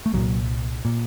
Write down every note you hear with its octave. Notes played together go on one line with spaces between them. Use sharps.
A3
C2 A#2 F#3
A#2